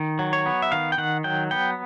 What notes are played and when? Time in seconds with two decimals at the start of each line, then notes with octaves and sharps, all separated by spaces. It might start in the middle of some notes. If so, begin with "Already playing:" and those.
Already playing: D#3
0.19 F#3
0.33 C#5
0.46 B3
0.62 E5
0.72 D#3 F5
0.92 G5
0.98 D#3 F#5
1.24 F#3 G5
1.51 B3 G5